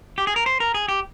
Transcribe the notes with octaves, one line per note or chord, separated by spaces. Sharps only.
G4
G#4
A#4
C5
A#4
G#4
G4